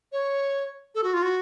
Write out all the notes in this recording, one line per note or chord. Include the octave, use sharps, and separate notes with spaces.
C#5
A4
F#4
F4
F#4